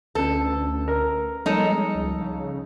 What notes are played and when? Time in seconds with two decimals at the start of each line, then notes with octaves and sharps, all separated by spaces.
0.15 D2 C#4 A4 B4
0.88 A#4
1.46 F3 G3 G#3 D#4 A4
1.95 C#2
2.21 C#3